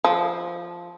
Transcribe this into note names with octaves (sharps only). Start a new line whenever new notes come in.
F3